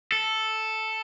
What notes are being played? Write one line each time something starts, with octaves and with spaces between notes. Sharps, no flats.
A4